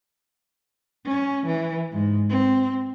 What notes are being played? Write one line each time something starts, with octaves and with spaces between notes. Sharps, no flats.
C#4
E3
G#2
C4